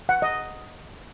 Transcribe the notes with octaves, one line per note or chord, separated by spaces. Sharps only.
F#5
D#5